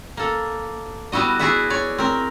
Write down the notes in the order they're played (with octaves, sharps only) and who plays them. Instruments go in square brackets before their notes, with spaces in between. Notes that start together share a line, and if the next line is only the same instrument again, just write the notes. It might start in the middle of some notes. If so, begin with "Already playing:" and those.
[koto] A#3 A4
G3 B3 E4 F#4 D#5
E4 F#4 G#4 D5 E5 F#5
C#5 D5
C4 A#4